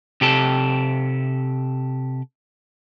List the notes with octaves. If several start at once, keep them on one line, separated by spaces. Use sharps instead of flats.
C3 G4 A4